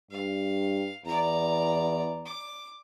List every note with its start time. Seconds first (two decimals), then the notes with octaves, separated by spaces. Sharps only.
0.11 G2 F5
1.05 E2 D5 A#5
2.25 D6